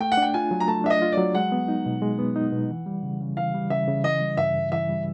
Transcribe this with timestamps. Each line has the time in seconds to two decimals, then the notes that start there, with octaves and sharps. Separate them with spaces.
0.01 A3 G5
0.12 F#5
0.17 D4 G5
0.34 F4 G#5
0.51 F#3
0.60 A#5
0.68 A3 A5
0.84 D4 E5
0.90 D#5
1.02 F4
1.12 D5
1.18 F#3
1.34 G#3 F#5
1.52 B3
1.68 D#4
1.86 B2
2.02 G#3
2.19 B3
2.36 D#4
2.53 B2
2.70 E3
2.86 G3
3.03 C#3
3.20 C#3
3.37 E3 F5
3.54 G3
3.70 C#3 E5
3.88 C#3
4.04 E3 D#5
4.21 G3
4.37 G2 E5
4.55 G2
4.72 E3 E5
4.89 G3